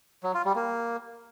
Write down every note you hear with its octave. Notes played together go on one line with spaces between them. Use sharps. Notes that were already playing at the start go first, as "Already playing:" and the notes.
F#3
F4
G3
A#3